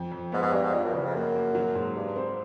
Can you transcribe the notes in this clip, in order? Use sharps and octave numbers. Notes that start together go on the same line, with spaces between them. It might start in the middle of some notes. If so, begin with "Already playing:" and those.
Already playing: F2
F2
G#2 B3
G#2
G2 G3
G#2
G2 F3
F#2
E2 C#3
F2
F#2 A#3
A#3
F#3
G#2
G2 G3
C4